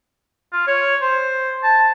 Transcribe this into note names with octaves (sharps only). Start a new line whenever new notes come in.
F4
C#5
C5
A5